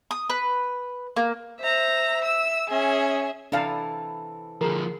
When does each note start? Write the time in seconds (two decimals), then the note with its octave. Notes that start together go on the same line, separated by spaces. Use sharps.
0.11 D#6
0.30 B4
1.17 A#3
1.61 C5 E5 A#5
2.24 E6
2.69 C#4 G#4 E5
3.52 C3 E3 D4 A4 F5 A5
4.61 D3 F3 G#4 A#4